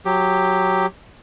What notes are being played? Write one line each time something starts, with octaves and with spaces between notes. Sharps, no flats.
F#3 G4